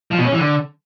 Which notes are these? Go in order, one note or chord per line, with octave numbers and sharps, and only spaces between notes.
F3
B2
C#4
E3
D3